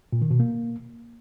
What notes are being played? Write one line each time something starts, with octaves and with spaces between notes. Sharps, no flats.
A#2
D#3
B2
A#3